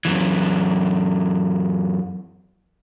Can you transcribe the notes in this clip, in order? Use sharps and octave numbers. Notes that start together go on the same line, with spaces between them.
F#2 E3